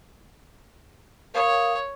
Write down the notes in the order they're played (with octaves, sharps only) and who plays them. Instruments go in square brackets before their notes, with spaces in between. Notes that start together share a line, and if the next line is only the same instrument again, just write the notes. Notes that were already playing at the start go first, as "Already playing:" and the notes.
[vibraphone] A#4 F5 D#6 [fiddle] C#5